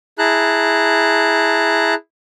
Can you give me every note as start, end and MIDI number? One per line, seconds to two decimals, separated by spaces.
0.19 1.94 64
0.19 1.94 68
0.19 1.94 81
0.19 1.94 82
0.19 1.94 90